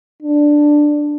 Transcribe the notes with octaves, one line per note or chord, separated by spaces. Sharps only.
D4